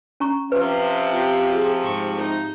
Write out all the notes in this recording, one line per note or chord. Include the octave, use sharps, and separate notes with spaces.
C#4 A#5 C#6
C3 F3 B4
C4 F4 G4
G#4
G#2 C#6
D#4